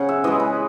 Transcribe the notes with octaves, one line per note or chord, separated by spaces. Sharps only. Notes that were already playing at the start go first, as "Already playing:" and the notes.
Already playing: C#3 F#5 G#5
E5
E3 G#3 D#5
B4